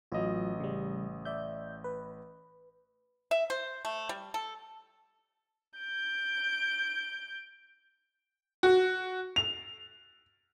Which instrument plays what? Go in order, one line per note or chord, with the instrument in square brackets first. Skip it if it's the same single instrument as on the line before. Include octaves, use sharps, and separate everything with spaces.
[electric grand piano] A1 D#5 [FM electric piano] F#3 F4
[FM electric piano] C#3 G3
D5 E5 G6
B4
[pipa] E5
C5
A3
G3
A4
[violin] G6 D7
[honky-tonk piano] F#4
F7